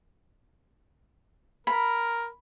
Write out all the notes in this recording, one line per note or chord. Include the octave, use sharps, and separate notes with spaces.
A#4 B5